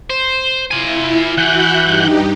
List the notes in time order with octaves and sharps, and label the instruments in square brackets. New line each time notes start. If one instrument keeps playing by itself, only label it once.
[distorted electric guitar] C5
[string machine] E4 [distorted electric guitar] F4 G#5
[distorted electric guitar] E3 [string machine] F#4 E5 [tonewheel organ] F#5 F#6 G6
[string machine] G2 D#4 G4